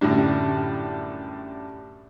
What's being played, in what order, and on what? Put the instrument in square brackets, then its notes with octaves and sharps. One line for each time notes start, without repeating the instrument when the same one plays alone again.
[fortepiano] F#2 A2 D3 G3 D4